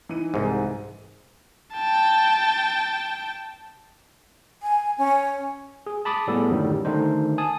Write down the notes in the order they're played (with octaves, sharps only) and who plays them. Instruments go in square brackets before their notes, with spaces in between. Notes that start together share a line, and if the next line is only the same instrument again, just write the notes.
[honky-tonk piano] E3 D#4 D#7
[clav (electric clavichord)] C2 G#2
[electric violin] G5 A5
[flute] G#5
C#4
[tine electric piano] G#4
A5 B5 D6 D#6 A6
A2 G3 B3 G#4 A4
F#2 A2 D3 D#3 G3
D3 D#3 A3 D4 D#4 C5
G#5 A5 D#6